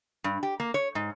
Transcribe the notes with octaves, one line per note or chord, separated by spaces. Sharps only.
G2
G4
A#3
C#5
G#2